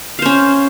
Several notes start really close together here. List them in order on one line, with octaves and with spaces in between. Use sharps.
F5 C5 C#4